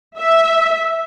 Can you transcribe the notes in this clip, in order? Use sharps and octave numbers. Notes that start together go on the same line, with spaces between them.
E5